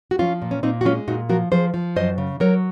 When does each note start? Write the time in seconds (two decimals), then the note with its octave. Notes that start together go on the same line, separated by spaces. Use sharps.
0.11 F#4
0.19 F3 C#4 F4
0.42 A#2
0.51 C#4
0.63 A#2 C4 D#4
0.81 F#4
0.85 G#3 C#4 F4
1.08 A#2 D#4 F#4
1.29 F3 F#4 A#4
1.52 F3 G#4 C5
1.74 F3
1.96 F#2 C5 D#5
2.18 C#3
2.40 F#3 A#4 C#5